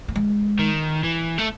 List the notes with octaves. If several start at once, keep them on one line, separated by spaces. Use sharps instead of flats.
A3
G#3
D#3
E3
A3